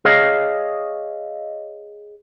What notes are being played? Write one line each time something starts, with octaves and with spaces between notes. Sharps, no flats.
G#4 C#5 D#5 F5